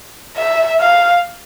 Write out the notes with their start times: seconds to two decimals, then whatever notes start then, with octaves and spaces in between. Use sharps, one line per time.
0.37 E5
0.80 F5